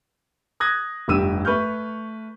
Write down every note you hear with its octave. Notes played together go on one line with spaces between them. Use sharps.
D#6 F#6 G#6 A#6
F1 G2 G4 E6 D#7
A3 B4 C#6 F6 G6